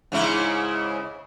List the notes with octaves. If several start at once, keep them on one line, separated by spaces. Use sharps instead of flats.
G#2 C#3 E4